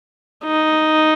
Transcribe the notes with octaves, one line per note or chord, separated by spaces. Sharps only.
D#4